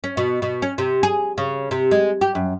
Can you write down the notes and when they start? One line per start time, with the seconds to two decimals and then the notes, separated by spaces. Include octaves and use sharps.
0.04 C#4
0.17 B2
0.42 B2
0.62 C#4
0.78 C3
1.03 G#4
1.38 C#3
1.71 C3
1.91 G#3
2.21 G4
2.35 F#2